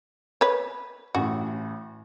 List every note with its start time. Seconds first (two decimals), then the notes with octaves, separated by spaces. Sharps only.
0.41 B4 C#5
1.15 A1 A2 F#4